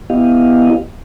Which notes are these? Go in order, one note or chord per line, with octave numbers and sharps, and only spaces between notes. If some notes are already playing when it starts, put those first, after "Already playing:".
B3 E4 G4 D#5 F5